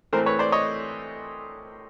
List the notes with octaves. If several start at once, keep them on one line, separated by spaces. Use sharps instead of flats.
A2 E3 A3 C4 A#4 C5
B4 C#5
C5 D5
C#5 D#5